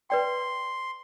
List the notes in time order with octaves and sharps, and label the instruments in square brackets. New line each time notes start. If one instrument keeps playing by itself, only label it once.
[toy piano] B4 D5 G5 [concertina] C6